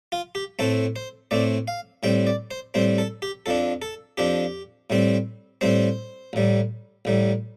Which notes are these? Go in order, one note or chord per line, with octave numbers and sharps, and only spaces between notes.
F4
G4
A2 A3 C4 A4
C5
A2 A3 C4 D5
F5
A2 G3 C4 G5
D5
C5
A2 G3 C4 C5
A4
G4
F2 F3 D4 A4
A4
F2 F3 D4 G4
A2 G3 C4
A2 G3 C4 C5
A1 A2 G3
A1 A2 G3